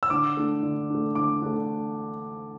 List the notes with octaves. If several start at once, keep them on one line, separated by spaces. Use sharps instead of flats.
E6
D3 D6
A3 D4
D3
A3 D4
D3 D6
A3 D4